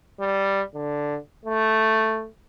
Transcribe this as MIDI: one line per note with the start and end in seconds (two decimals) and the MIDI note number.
0.20 0.62 55
0.74 1.17 50
1.45 2.27 57